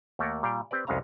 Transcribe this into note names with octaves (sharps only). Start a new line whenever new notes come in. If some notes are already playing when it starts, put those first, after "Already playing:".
D#2 A3 A#3 A4 A#4 F#5
A#2 G3 F5 G5
C4 G4 B4 D5
C2 F2 G#3 C#4 F5 A#5